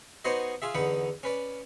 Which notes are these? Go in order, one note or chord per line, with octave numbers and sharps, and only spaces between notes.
B3 D#4 F#4 C5 C#5 D#5
F4 G#4 E5
E2 D3 D#4 B4 F#5
C#4 B4 D5